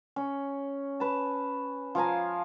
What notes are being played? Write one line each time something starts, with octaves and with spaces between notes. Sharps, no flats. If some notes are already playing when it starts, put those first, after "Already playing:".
C#4
B4 A5
F3 F5 G#5 A#5